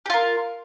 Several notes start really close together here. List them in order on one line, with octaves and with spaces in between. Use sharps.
G4 F4 A#4